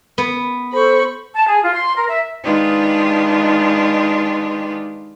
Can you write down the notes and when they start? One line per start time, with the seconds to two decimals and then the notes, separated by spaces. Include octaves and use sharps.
0.18 B3
0.73 A4 C5 B5 C#6
1.35 A5
1.47 G#4
1.63 F4
1.76 C6
1.96 A#4
2.09 E5
2.43 D#3 G#3 D4 F4 G4 B4